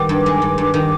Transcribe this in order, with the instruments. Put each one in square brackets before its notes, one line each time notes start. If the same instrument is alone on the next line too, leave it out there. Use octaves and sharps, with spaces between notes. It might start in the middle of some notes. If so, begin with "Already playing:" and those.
Already playing: [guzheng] D#3 G3 B3 [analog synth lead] D6
[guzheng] G2
G#3
G2
G2
D#3